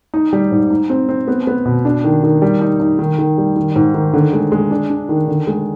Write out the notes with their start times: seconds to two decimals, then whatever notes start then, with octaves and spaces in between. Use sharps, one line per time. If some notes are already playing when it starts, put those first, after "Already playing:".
0.14 D#4
0.33 G3
0.51 G#2
0.70 D#4
0.90 C4
1.09 C4
1.28 B3
1.47 B3
1.65 B2
1.85 D4
2.04 D#3
2.23 D#3
2.42 G3
2.61 D#4
2.80 D#4
2.99 D#3
3.18 D#3
3.38 G3
3.56 D#3
3.76 G#2
3.94 D#3
4.14 D3
4.33 G#3
4.52 G#3
4.71 D4
4.90 D4
5.09 D#3
5.28 D3
5.47 G#3